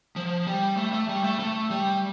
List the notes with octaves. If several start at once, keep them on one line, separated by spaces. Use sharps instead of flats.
F3
G3
A3
A3
G3
A3
A3
G3